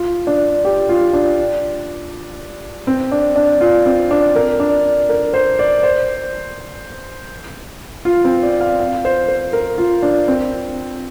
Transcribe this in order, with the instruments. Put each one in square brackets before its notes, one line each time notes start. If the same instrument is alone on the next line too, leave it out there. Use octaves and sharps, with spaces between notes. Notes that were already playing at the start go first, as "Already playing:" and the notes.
Already playing: [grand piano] F4
D4
G4
F4
D4
C4
D4
D4
F4
C4
D4
A#4
D4
A#4
C5
D5
C5
F4
C4
D5
F5
F5
C5
C5
A#4
F4
D4
C4